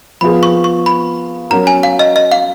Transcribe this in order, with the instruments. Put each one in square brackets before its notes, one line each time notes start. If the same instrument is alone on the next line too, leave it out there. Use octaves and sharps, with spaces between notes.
[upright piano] F3 B3 F4 G#4 [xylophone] B5
[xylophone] C#6
C#6
B5
[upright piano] F#3 C#4 F#4 A#4 [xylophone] A#5
[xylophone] G#5
F5
D#5
D#5
F5